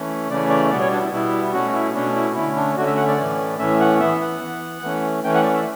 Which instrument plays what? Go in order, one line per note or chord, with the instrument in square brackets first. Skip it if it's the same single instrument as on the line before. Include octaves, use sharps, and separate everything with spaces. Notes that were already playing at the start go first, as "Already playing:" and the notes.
Already playing: [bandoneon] E3 A3 C#4
C#3 E3 A3 C#4 D5
D5
B2 G3 B3 D5
C#5
D4
E4
B2 G3 B3 E4
B2 A3 C#4 F#4
E4
B2 A3 C#4 D4
E4
D3 A3 C#4 E4
D4
D3 A3 C#4 F#4
E5
F#5
D5
A2 E3 A3 C#4
A2 E3 A3 C#4 E5
F#5
E3 B3 E5
F#5
E3 B3
E3 A3 C#4
E3 A3 C#4 G5
F#5
D5
E5